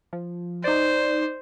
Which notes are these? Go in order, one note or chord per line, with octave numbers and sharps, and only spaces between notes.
F3
D#4 C5 D5